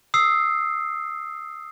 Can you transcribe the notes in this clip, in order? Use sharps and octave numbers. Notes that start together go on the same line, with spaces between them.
D#6 E6 C7